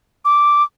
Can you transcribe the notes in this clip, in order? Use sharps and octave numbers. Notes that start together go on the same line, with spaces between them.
D6